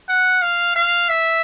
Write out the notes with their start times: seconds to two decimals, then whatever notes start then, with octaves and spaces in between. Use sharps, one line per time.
0.09 F#5
0.42 F5
0.76 F5
1.09 E5